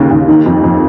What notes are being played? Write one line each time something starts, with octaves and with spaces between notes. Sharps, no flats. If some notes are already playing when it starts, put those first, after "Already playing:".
Already playing: D#2 C#3
D#2
D#3
F2
F2